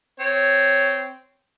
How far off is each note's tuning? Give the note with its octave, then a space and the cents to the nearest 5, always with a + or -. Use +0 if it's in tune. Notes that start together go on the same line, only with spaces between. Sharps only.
C4 -10 C#5 +0